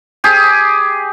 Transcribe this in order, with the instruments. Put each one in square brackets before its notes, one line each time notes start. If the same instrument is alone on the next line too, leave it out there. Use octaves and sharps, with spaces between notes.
[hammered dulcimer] G4 G#4